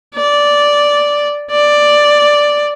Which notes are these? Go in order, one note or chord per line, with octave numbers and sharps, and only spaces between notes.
D5
D5